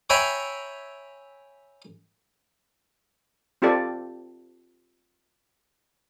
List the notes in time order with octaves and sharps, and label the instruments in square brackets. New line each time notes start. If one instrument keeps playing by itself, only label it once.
[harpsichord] C#5 E5 G5 G#5 A#5 B5
[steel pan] C4 F4 G4 A4 D5